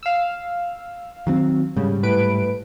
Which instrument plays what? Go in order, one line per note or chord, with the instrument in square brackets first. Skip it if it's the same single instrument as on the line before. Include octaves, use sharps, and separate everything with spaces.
[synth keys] F5 E6
[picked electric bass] D#3 F#3 C4
[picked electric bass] G#2 G3 [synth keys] C#3
[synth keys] A2 B4 D7